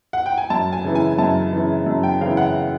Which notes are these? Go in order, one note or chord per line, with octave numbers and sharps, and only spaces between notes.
F#5
G5
G#5
F#2 A5
G#5
C#3 E3
G#5
F#2 A5
C#3 E3
F#2
G5
C#3 E3 F5
F#5